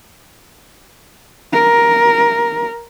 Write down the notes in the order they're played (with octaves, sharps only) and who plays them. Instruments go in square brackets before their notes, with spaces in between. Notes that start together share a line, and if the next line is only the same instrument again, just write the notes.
[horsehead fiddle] A#4